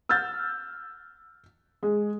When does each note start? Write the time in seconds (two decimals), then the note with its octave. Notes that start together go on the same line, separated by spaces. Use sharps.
0.09 E6 F6 G6 A6
1.83 G#3